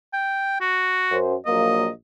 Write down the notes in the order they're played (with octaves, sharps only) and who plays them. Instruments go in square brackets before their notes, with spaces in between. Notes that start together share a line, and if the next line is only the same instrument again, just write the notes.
[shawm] G5
F#4
[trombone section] F#2 C5
[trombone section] A#1 F#3 A#3 [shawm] D#5